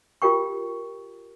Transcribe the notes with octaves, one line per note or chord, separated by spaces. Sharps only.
F4 G4 A#4 G5 C#6